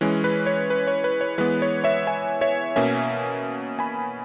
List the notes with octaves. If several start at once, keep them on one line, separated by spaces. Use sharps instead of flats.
E3 G#3 C#4
B4
C#5
B4
C#5
B4
C#5
E3 G#3 B3 B4
C#5
C#5 E5
E5 G#5
C#5 E5
B2 A#3 C#4 E5 G#5
G#5 B5